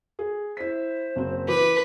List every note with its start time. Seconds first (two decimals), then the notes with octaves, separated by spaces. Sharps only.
0.19 G#4
0.57 E4 C5 B6
1.16 F#1 C4
1.48 E3 B4 D6